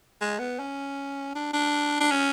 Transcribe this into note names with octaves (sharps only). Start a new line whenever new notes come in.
G#3
B3
C#4
D4
D4
D4
C#4